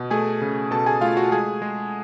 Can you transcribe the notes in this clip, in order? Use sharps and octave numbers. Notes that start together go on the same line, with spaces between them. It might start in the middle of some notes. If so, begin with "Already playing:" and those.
Already playing: B2
A3 G#4 G#5
C#3
B2 A4 A5
G#4 G#5
A3 F4 F5
F#4 F#5
G#3 G#4 G#5
G#3